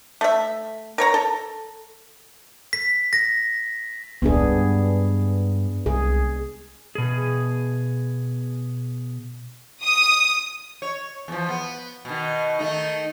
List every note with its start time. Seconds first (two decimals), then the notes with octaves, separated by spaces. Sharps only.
0.21 A3 E5
0.98 A#4 C#5 A#5
1.14 A4
2.73 B6
3.13 A#6
4.22 D#1 C2 B3 D4 G#4
4.41 G2
5.86 C2 G#4
6.95 B2 G#4
9.84 D#6
10.82 C#5
11.28 E2 F3
11.49 B3
12.05 B2 D#3
12.59 D#3 A3 D#4